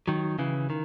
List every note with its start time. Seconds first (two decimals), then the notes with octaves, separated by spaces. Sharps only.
0.08 D#3 F#3
0.39 C#3 E3
0.70 D#3